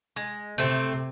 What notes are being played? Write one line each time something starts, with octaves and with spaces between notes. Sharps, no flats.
G#3
C3 A3 C4